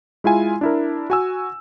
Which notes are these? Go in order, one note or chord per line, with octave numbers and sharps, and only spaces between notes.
G#3 E4 F4 G#5
D4 E4 A#4
F#4 G#5 E6